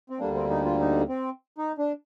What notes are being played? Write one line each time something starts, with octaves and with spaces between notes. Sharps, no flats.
C4
D2 D3 G3 A#3 D4
C4
D#4
F4
D#4
C4
D#4
D4